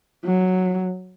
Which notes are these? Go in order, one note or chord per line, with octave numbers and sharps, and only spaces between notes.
F#3